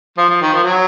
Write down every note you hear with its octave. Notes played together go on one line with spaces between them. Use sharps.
F3
F3
D#3
F3
F#3